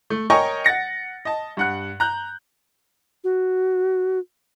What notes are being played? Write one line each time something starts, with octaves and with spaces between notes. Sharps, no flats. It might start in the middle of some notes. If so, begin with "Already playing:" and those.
A3
A#4 C#5 D#5 G5 G#5 C#6
F#5 A6 A#6 C#7
D#5 A5
G2 F#5 F#6
A#5 F#6 G6
F#4